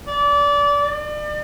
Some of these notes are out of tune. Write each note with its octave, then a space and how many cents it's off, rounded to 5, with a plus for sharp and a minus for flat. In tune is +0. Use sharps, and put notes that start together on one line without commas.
D5 -25
D5 +35